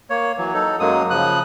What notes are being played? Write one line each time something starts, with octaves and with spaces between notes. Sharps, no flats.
A#3 C#5
E3 F#3
D#4 A4
F#2 F#3 G#3 A#3 D#6
C#3 F3 D#6 F#6